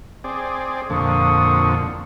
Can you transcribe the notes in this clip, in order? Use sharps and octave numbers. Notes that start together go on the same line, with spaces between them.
C4 G#4 D5
F2 A#2 D3 C#6 D#6